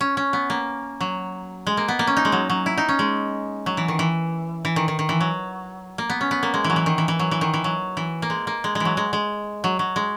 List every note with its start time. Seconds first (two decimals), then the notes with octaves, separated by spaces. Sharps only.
0.01 C#4
0.17 C#4
0.33 B3
0.50 A#3
1.01 F#3
1.67 G#3
1.77 A#3
1.88 B3
1.99 A#3
2.07 C#4
2.17 D#4
2.25 G#3
2.32 F#3
2.50 F#3
2.66 E4
2.78 D#4
2.89 C#4
2.99 G#3
3.66 F#3
3.77 E3
3.88 D#3
3.99 E3
4.65 E3
4.76 D#3
4.88 D#3
4.99 D#3
5.09 E3
5.20 F#3
5.98 A#3
6.10 B3
6.21 C#4
6.31 B3
6.43 A#3
6.54 G#3
6.64 E3
6.70 F#3
6.76 E3
6.86 D#3
6.98 E3
7.08 E3
7.19 F#3
7.31 E3
7.41 D#3
7.54 E3
7.64 F#3
7.97 E3
8.22 A#3
8.30 G#3
8.47 A#3
8.64 G#3
8.75 G#3
8.80 E3 F#3
8.97 G#3
9.13 G#3
9.64 F#3
9.79 F#3
9.96 G#3